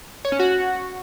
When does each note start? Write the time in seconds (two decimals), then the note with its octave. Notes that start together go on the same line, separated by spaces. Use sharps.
0.25 C#5
0.32 C#4
0.39 F#4